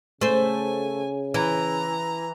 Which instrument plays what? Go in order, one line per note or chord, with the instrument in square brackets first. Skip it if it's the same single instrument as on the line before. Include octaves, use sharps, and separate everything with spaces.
[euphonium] C#3 [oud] A3 C5 [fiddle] G#5
[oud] E3 [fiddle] A#5